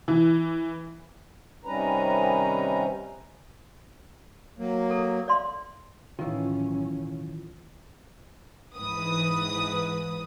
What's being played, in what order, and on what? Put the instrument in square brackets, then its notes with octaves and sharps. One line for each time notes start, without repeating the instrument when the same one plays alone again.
[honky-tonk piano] E3
[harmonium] C3 D#3 G3 C#4 B4 A#5
[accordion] F#3 A#3
[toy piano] A4
D5 F5 C6
[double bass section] B1 A2 C#4 [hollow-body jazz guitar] D#3 E3 [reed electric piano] F4
[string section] G#2 E3 B4 D#6